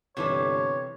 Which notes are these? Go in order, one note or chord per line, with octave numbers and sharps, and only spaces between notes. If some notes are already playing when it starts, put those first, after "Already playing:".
G1 C3 E3 A4 C#5 D6